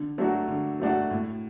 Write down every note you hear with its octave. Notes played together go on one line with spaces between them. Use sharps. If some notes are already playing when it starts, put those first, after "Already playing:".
Already playing: D3
F#3 A3 D4 F#4
D3
F#3 A3 D4 F#4
A2